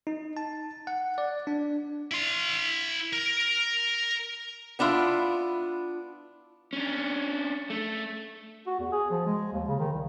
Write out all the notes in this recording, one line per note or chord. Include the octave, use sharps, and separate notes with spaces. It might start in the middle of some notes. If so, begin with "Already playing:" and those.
D#4
A5
F#5
D5
D4
E4 C6
A#4
B3 D4 E4 F4
C#4 D4
A3
F#4
E2
G#4
F3
G#3
D#2
C#3
D#3
C2